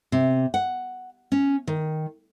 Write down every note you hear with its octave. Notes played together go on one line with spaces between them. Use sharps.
C3
F#5
C#4
D#3